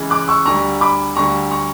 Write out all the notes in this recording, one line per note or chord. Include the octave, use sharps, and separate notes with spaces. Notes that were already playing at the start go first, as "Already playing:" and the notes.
Already playing: C#2 C#3 E3
D6 F#6
C#6 E6
D2 D3 G3 A#5 C#6
B5 D6
D2 D3 G3 A#5 C#6
A#5 C#6